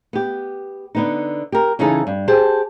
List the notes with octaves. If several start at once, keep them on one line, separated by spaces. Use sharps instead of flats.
B3 G4
D3 B3 D#4
G4 A#4
C#3 E3 C#4 D#4 G#4 A4
G2
G4 G#4 C5 A5